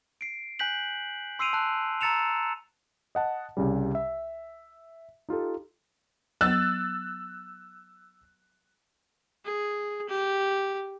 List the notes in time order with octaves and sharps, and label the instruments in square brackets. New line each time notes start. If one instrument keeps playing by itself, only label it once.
[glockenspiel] C7 D7
G#5 F#6 G6 B6 F#7
C6 E6 C7 D7 D#7 F7
A5 F#6 D#7
A#5 E6 A6 C#7 E7 F7
[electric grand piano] D#5 F#5 A5
C2 C#3 G3
E5
D#4 F4 G4 A4
[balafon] F#3 B3 [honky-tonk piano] E6 F#6 A6
[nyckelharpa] G#4
G4